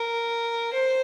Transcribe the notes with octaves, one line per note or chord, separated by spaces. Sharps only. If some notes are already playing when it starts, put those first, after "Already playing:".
Already playing: A#4
C5